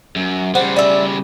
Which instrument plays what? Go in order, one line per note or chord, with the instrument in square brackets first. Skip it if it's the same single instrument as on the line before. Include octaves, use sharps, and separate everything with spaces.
[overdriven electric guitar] F#2
[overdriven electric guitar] C#3 G3 [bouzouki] C5 F#5
[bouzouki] D5 E5